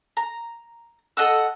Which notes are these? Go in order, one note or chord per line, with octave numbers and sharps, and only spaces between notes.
A#5
A4 D#5 F#5 E6